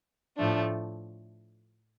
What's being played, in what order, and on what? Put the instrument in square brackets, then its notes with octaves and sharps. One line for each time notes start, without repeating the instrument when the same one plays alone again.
[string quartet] A2 F3 A3 D4